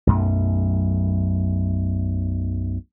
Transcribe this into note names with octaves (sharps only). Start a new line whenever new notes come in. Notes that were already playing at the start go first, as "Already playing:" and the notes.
B1 F#2 A3